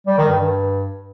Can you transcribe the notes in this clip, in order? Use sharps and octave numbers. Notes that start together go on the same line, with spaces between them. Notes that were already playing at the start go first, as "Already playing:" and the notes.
G3
D#3
G2
G2